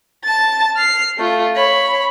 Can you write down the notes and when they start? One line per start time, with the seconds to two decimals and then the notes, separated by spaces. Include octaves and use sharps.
0.24 A5 A6
0.76 F6 C7
1.18 A3 F4
1.56 C#5 B5